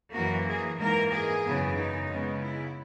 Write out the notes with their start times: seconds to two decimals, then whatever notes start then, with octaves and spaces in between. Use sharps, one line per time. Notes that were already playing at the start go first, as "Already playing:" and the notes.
0.13 F#2 E3 A#3 F#4
0.47 G#4
0.79 G#2 E3 A#3 A#4
1.12 G#4
1.44 F#2 C#3 E3 B3
1.78 D#4
2.10 C#3 G#3 B3
2.43 E4